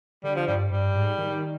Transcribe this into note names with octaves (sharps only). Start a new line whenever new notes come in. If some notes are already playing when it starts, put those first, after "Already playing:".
D3 G3
F3
G2 G3
G2 G3
G#2
D#3